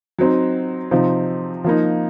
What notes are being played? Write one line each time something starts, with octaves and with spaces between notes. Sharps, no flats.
F#3 C4 D#4
C3 F3 C4 D#4
F3 A#3 D#4